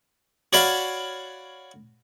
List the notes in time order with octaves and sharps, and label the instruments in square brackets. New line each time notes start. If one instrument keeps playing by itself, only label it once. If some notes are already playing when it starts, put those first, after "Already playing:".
[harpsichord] F#4 C#5 D5 F5 B5